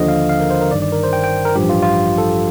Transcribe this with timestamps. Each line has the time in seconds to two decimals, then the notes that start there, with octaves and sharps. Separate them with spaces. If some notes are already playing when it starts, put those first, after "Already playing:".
Already playing: D#2 D3 F3 D#5
0.08 F5
0.29 F5
0.40 A#4
0.50 C5
0.61 A#4
0.71 G1 G2 D#3 D5
0.82 D5
0.92 A#4
1.03 C5
1.13 G5
1.24 G5
1.45 A#4
1.56 A1 G2 F3 G4
1.69 F4
1.83 F4
2.18 A4